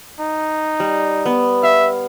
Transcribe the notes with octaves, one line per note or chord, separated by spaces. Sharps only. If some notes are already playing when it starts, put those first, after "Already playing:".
D#4
G3
B3
E5 F5